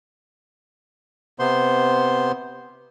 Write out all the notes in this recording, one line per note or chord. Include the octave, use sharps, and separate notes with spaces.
C3 B3 C5 C6